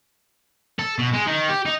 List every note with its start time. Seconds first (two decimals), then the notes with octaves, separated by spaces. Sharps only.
0.79 A4
0.99 B2
1.14 G#3
1.27 D#3
1.49 G4
1.66 D#4